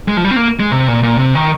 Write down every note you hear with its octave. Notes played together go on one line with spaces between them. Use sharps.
G#3
F3
G3
C4
A#3
G#3
C3
A#2
A#2
C3
D#3